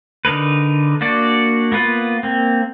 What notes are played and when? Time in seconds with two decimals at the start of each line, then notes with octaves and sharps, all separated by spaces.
0.25 D3 D#4 A#4 B4
1.01 A#3 D4 F#4 D5
1.72 A#3 B3 F4 B4
2.23 A#3 C4